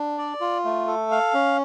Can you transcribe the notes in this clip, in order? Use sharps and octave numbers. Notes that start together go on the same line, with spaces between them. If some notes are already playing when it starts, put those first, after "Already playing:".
Already playing: D4
D5
F4
A3
A4
F5
C#4